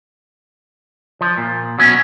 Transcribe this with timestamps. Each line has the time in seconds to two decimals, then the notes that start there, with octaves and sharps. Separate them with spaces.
1.21 F3
1.38 A#2
1.78 B2 F#3 C#4